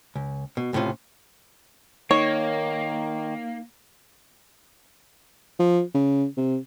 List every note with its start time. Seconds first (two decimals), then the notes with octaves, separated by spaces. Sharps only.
0.16 C#2
0.57 B2
0.73 C#2 A2 C3 C#4 F4
2.11 D#3 A#3 D#4 C#5
5.59 F3
5.94 C#3
6.37 C3